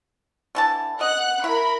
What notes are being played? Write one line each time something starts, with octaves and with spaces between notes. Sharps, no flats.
D3 E3 A5
D#5 F#5 F#6
E4 A#4 B5